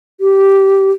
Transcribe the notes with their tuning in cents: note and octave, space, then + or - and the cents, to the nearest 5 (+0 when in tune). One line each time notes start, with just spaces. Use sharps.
G4 -10